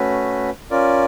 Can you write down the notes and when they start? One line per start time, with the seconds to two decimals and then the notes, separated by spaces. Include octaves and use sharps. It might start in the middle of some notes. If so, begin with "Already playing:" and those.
Already playing: A3 C#4 F#4 B4
0.71 C#4 F4 A#4 D5